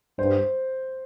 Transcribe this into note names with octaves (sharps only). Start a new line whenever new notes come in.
G2 C5